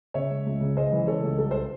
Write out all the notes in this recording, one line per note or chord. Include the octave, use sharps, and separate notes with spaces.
C#3 C#5 E5
G#3
C#2
C#3
G#3 C5 D#5
E3
C#3 A4 C#5
C#2
C2 A4
C5